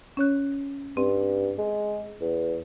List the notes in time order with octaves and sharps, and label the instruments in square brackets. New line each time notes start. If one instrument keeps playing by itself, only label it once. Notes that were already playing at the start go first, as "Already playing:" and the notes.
[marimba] C#4 C#5 F#6
[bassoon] G2 [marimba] C4
[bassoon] G#3
E2